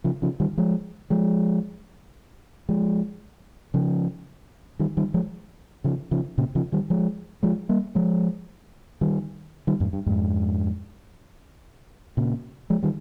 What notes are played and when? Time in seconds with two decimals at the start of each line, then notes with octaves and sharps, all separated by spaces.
0.04 C#3 F3
0.22 C#3 F3
0.40 D#3 G3
0.58 F3 G#3
1.10 F3 G#3
2.69 F3 G#3
3.74 C#3 F3
4.79 D#3 G3
4.97 D#3 G3
5.14 F3 G#3
5.84 C#3 F3
6.11 C#3 F3
6.38 A#2 C#3
6.55 C#3 F3
6.72 D#3 G3
6.90 F3 G#3
7.43 F3 G#3
7.69 G3 A#3
7.95 F3 G#3
9.01 D#3 G3
9.67 D#3 G3
9.80 F2 G#2
9.93 G2
10.06 F2 G#2
12.17 A#2 C#3
12.70 F3 G#3
12.83 D#3 G3